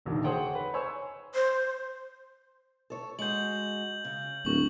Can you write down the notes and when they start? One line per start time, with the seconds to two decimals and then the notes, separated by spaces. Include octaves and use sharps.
0.06 F#1 E2 B2 D3 D#3
0.24 G#4 A4 C5 C#5 F#5 G5
0.55 B4
0.74 C5 C#5 G#5 C#6 E6
1.34 C5
2.90 A4 C#5
3.19 G#3 F#4 G6 F#7
4.04 C#3
4.45 D1 C#6 F#7